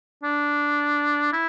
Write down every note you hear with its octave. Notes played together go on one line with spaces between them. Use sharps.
D4
E4